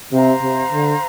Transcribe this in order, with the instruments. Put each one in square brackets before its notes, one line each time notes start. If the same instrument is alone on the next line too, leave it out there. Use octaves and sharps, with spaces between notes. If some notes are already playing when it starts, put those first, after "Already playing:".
[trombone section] C3 [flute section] C5 F5 A#5
[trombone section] C3
D3